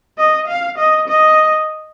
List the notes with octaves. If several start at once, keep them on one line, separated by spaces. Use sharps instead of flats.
D#5
F5
D#5
D#5